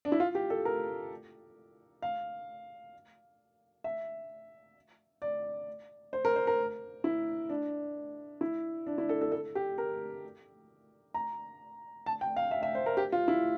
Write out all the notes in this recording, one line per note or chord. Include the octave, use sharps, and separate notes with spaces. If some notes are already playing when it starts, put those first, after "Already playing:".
D4
E4
F4
G4
A4
A#4
F5
E5
D5
C5
A#4
C5
A#4
E4
D4
E4
D4
E4
A4
A4
A4
G4
A#4
A#5
A5
G5
F5
E5
E5
C5
A#4
G4
F4
E4